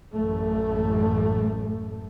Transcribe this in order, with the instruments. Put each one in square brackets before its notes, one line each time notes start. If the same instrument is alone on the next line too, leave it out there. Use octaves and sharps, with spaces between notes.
[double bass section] A1 F#2 A3